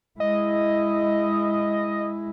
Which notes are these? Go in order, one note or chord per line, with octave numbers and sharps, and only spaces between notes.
G#3 E4 D#5